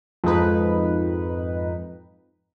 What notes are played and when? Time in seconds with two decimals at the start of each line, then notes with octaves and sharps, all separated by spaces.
0.24 F2 G#2 D#4 B4